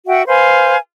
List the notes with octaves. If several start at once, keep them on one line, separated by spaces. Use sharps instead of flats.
F#4 E5 F#5 G5
B4 C5 F5 G#5